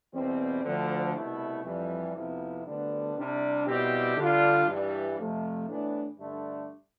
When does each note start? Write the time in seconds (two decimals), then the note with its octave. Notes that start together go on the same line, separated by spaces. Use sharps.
0.14 E2 B2 G3 C4
0.64 D2 D3 F3
1.15 C2 B2 A3 E4
1.65 F2 E3 G3
2.15 F2 C3 F3 B3 E4
2.66 D2 D3 G3 B3 D4
3.17 C2 C3 G3 D4
3.67 B2 G3 C4 E4 G4
4.17 D3 G3 D4 F4
4.68 G2 E3 G3
5.19 F2 C3 F3 A3
5.68 A2 E3 B3 D4
6.19 G2 D3 A3 D4